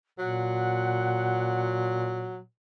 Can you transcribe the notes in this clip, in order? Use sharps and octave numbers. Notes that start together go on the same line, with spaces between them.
A#2 F#3 F#5